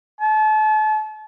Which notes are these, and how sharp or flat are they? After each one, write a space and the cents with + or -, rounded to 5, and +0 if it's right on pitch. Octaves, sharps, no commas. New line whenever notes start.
A5 -35